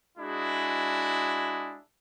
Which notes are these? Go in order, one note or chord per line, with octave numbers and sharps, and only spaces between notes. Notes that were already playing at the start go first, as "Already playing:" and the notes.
G#3 D4 E4 F#4 G#4